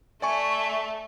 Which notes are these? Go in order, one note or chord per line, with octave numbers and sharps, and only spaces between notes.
A3 D5 G#5 C#6